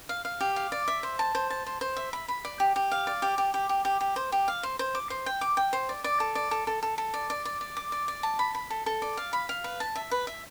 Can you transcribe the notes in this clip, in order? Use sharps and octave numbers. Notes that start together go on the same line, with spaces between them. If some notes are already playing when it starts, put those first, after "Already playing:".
F5
F5
G4
F5
D5
E5
C5
A5
C5
A5
C5
C5
E5
B5
B5
D5
G4
G4
F5
D5
G4
G4
G4
G4
G4
G4
C5
G4
F5
C5
C5
D6
C5
G5
D6
G5
C5
D5
D5
A4
D5
A4
A4
A4
A4
D5
D5
D5
D5
D6
D5
D5
A5
B5
B5
A4
A4
D5
F5
B5
F5
B4
A5
E5
B4
E5